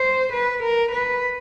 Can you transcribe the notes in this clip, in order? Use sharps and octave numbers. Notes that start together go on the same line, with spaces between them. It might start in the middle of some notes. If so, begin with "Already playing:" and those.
Already playing: C5
B4
A#4
B4